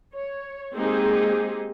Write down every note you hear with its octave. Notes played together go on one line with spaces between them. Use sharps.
C#5
G#3 A#3 C4 D#4 G4 G#4